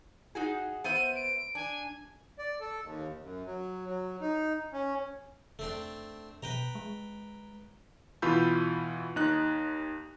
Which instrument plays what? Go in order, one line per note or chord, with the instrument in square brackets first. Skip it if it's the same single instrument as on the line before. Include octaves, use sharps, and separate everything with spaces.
[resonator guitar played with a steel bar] D#4 F#4 G#4
[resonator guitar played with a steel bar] B3 C5 E5 [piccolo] D#7
[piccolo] D7
[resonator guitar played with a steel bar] D4 [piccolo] G#5
[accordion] D5
A4
D#2
F#2
F#3
F#3
D#4
C#4
[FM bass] E1 [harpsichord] A3 C4 D4
[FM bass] B2 [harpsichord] B4 G5 A#5
[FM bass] G#3
[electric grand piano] B2 E3 F4 B5 E6 G6
D#2 D#4 F#6